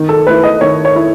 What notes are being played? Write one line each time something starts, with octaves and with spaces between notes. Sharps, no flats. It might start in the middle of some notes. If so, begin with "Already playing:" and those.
Already playing: D#3
A4
A3 E4 B4
D#5
D#3 C#5
C#5
E4